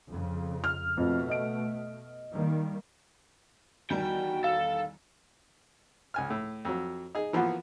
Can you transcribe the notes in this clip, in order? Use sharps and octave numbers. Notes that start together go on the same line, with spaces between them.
F2 C#3
F6
F2 B2 A3
D#5 D7
D#3 G3 A#3
E2 D#3 G3 F#4 G5
A4 F5
C#2 G#5 F6
A2
F2 F#3
D#4 G#4
E3 F3 A#3 B3 F#4